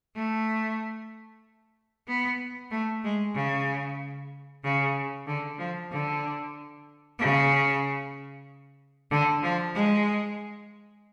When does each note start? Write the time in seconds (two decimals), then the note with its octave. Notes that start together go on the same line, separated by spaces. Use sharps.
0.15 A3
2.08 B3
2.71 A3
3.04 G#3
3.35 C#3
4.64 C#3
5.27 D3
5.58 F3
5.91 D3
7.19 C#3
9.11 D3
9.43 F3
9.74 G#3